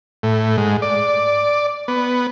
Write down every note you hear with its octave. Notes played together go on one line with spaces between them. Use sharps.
A2
G#2
D5
B3